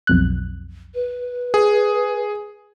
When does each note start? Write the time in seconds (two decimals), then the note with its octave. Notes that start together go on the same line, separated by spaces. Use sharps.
0.07 B1 F2 F#6
0.94 B4
1.54 G#4